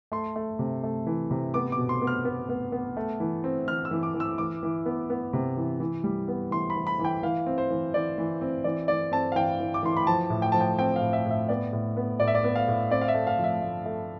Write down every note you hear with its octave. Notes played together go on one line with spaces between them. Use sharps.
A3 C6
A3
C3
A3
E3
C3
B3 D6
D6
B2
C6
B3
F6
B3
B3
B3
A3
E3
C4
E3 F6
E6
E3
D6
E3
E6
E3 D6
E3
B3
B3
C3
E3
E3
G3
B3
E3 C6
B5
E3
B5
E3
G5
E3 F5
C4
C5
E3
E3 D5
E3
C4
E3 D5
E3 D5
C4 A5
F5
E3 G5
E3
D6
E3 C6
B5
F3 A5
A2
G5
F3 A5
G5
C4 G5
F5
A2
E5
A2
E5
B3 D5
A2
B3
A2 D5
E5
D5
B3
F5
A2
C4 D5
F5
E5
A3
F5
F3
E5
A3
A3